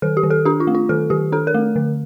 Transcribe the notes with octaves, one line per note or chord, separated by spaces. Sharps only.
D#3 A4
G4
D#3
A4
D4 G4
F4
A3
F4
D#3 A4
D#3 G4
D4 A4
A#4
A3
D3